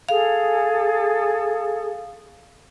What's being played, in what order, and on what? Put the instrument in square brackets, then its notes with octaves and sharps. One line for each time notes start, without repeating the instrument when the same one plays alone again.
[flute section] G#4 A4 [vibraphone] F5